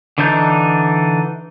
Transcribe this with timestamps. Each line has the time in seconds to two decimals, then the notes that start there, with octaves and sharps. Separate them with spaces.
0.18 D3 E3 D4 D#4 G6